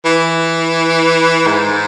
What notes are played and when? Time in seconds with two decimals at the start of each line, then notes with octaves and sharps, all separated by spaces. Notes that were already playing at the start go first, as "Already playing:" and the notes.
0.06 E3
1.47 G#2